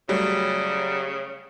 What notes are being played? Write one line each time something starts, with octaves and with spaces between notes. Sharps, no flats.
C#3 F#3 G3 A3